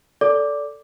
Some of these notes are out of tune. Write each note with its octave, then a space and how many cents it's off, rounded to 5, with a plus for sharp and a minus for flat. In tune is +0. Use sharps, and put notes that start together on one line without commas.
A4 +0 D5 -20 D6 +0